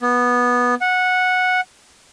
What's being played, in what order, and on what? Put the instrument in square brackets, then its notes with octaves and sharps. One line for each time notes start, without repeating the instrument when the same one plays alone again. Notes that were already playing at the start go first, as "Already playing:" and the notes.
[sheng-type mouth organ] B3
F#5